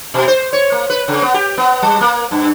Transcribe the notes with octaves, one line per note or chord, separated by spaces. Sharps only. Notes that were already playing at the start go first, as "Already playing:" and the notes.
B2
C5
C#5
A#3
B4
C#3
B3
G4
B3
G3
A#3
G2